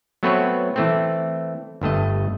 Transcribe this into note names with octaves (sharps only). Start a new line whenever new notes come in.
F#3 A3 B3 C4 B4 C#5
E3 A3 C4
G1 G2 A3 D#5